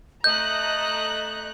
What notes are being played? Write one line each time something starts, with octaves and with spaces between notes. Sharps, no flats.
A3 D#5 A#5 F#6 G6